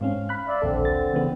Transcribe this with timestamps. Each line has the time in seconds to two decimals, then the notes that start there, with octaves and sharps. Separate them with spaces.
0.01 G#2 C4 C#4 F5
0.29 B5 F#6
0.48 D5 E5 F5
0.62 A#1 D#2 D3 C4 A4
0.85 A6
1.13 C#3 E3 B3